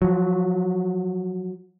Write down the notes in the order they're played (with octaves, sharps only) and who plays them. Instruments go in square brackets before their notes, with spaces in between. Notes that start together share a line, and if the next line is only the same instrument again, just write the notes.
[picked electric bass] F3 F#3